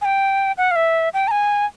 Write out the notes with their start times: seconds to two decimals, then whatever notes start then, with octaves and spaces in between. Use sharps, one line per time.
0.01 G#5
0.05 G5
0.58 F#5
0.71 F5
0.76 E5
1.14 G5
1.28 A#5
1.31 G#5